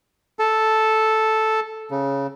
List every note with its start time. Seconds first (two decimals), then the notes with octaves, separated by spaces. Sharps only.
0.39 A4
1.91 C#3